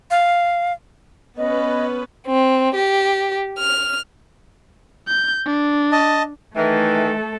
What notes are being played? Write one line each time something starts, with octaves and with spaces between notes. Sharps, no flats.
F5
B3 C#4 B4 D#5
C4
G4
F6
G6
D4
D#5 A5
D#3 E3 A3 A4